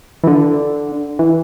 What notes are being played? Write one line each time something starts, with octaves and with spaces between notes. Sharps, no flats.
E3
D3
E3